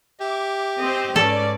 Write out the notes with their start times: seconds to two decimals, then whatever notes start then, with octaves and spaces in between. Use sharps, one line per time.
0.21 G4 E5 D6
0.80 C4 C5 D#5
1.16 G#2 C#4 A4 B4 D5